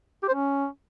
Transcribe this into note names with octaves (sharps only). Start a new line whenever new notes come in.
G4
C5
C#4